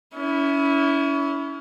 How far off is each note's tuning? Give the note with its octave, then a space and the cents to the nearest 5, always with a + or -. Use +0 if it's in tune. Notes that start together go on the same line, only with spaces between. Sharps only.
C#4 +30 E4 -10